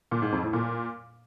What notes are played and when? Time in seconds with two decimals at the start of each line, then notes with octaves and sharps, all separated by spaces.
0.11 A#2
0.22 G#2
0.32 F2
0.43 A2
0.53 A#2